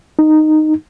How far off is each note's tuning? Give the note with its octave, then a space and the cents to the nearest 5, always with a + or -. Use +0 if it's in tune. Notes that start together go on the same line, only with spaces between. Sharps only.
D#4 -10